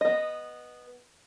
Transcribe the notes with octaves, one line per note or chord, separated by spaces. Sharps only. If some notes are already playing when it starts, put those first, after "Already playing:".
B3 D#5